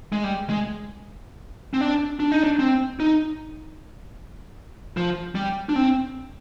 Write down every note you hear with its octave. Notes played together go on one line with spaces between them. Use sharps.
G#3
G3
G#3
C4
D4
D4
D#4
D4
C4
D#4
F3
G3
D4
C4